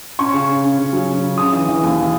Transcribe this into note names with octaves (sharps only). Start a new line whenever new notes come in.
C#4 C#6
C#3
C#3
C#4
C#3
F#3
C#4
C#3
C#3 D#6
E3
E3
D#2